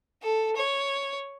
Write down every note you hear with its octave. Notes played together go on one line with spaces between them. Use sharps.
A4
C#5